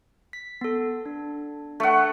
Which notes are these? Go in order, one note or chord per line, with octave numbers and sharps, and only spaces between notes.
B6
B3 A4
D4
A3 F#5